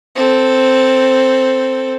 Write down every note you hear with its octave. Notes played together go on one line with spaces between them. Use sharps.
C4 A4